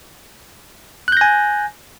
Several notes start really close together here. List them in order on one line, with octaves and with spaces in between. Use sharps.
F#6 G6 A#6 G#5